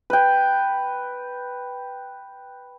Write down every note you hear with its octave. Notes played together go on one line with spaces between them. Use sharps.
B4 G5